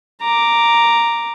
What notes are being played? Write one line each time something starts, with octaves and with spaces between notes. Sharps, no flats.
A#5 D6